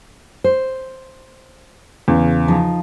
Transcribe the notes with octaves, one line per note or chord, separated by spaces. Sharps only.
C5
E2 C#3
F3 D#4